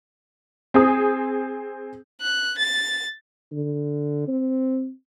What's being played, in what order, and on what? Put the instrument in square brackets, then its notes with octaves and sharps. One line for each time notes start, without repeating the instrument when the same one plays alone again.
[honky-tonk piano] C4 G#4 D#6
[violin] F#6
A6
[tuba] D3
C4